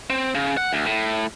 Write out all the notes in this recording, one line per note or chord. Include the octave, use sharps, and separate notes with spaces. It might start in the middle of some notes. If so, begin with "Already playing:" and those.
C4
C#3
F#5
D2
A2